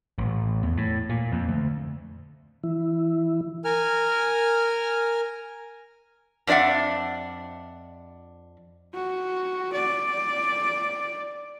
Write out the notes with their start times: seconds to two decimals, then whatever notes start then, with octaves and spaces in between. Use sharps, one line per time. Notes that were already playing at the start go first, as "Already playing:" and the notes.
0.18 A1
0.63 E2
0.77 A2
1.10 A#2
1.32 F2
1.49 D2
2.63 E3 E4
3.65 A#4 G#5 F6
6.47 F2 D4 D5 E5 F#5
8.94 F#4
9.73 D5